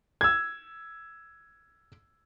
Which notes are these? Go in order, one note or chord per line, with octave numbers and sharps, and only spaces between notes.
E6 G#6